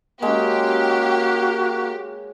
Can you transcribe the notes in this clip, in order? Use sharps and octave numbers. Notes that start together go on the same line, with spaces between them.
G#3 A#3 C#4 F#4 G4